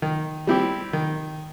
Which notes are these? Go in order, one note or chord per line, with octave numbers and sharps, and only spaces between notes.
D#3
G3 C4 E4 G4
D#3